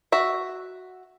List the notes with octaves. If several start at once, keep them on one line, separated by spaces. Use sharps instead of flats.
F#4 E5